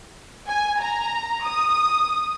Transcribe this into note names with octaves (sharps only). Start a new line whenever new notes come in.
G#5
A#5
D#6